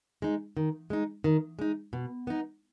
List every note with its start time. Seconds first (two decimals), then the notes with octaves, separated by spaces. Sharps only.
0.22 G#3 D#4
0.57 D#3
0.90 G#3 D#4
1.24 D#3
1.59 G#3 D#4
1.93 B2
2.27 B3 D#4